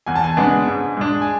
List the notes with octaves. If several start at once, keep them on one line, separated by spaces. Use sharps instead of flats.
E2 G#5
A5
G#5
C#3 G#3 B3 D4
G#2
G#3 D4
G#5